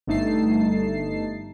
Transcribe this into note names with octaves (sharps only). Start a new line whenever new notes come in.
G1 G2 A3 D#4 A5 C7